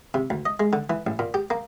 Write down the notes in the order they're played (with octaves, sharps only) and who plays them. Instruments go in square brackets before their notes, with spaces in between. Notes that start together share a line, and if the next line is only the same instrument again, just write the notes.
[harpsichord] C3
D2
D#5
G#3
D3
E3
A1
A#2
G4
A#3